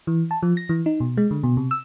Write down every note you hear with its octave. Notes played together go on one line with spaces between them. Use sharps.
E3
A5
F3
A#6
E3
D#4
B2
G#3
D3
B2
C3
E6